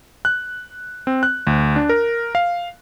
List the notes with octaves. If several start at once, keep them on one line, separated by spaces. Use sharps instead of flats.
F#6
C4
F#6
D2
D4
A#4
F5